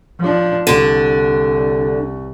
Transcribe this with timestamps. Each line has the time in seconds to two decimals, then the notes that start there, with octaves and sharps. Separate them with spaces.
0.19 F3 D4
0.67 C2 D3 D4